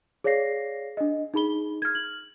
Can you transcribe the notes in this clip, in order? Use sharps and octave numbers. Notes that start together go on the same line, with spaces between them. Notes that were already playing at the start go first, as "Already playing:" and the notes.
G#4 C#5 D5 F5 A#6 C7
D4 D#5
D#4 G#4 B5 G7
F6 G#6
F#7